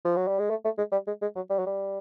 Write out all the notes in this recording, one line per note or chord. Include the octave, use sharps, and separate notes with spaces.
F3
F#3
G3
G#3
A3
A3
G#3
G3
G#3
G#3
F#3
G3
F#3
G3